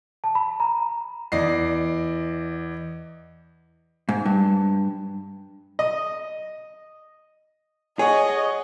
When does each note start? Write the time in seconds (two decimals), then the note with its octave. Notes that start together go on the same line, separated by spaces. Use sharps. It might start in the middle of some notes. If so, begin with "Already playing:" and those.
0.24 A5
0.35 B5
0.60 A#5
1.32 E2 D5 D#5 C7
4.09 G#2
4.26 G2
5.79 D#5
7.99 G#4 C#5 D#5 F#5 C#6